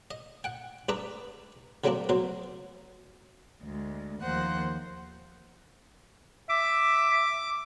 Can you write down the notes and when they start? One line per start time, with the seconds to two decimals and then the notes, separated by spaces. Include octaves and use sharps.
0.11 D#5
0.44 F#5 G5
0.89 G2 D4 B4 A#5 D#6
1.84 D3 F#3 G3 A#3 C4 D4
2.09 B2 F#3 C5
3.62 D2 G#3
4.21 D#2 F3 A#3 C5 F#5 F#6
6.49 E5 D6